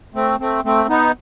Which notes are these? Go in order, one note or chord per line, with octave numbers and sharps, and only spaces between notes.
A3 C4
A3 C4
A3 C4
B3 D#4